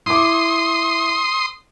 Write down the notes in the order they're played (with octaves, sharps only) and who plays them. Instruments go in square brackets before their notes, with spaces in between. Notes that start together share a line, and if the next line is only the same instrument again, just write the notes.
[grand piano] E4 D6 [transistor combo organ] C6 D#6